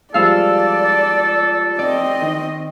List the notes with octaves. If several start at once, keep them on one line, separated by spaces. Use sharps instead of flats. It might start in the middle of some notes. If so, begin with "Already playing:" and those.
F3 G3 G#3 A4 D5 F5 E6
C4 D5 D#5
D#3